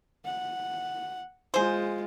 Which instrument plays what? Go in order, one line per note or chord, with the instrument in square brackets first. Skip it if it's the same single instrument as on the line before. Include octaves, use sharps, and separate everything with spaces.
[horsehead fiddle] F#5
[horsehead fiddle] G#3 F4 [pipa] G#4 C5